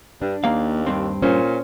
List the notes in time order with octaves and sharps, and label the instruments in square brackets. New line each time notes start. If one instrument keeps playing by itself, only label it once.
[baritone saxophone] G2 [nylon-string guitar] D4
[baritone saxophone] D#2 [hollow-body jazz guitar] A#3 F5
[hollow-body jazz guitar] G2 C4
[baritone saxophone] A#2 [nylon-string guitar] C#4 C5